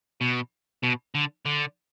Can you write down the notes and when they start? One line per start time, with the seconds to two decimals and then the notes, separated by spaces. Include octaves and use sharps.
0.21 B2
0.83 B2
1.15 D3
1.46 D3